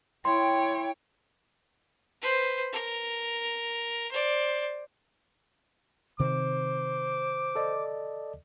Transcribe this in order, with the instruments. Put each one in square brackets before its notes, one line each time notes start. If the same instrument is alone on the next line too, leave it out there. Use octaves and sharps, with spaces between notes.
[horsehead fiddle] E4 [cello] C#5 [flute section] G5 [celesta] C6
[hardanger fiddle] B4 C5
A#4
C5 D5
[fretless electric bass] C3 D#3 C4 [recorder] C5 [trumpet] D6
[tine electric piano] A4 D5 D#5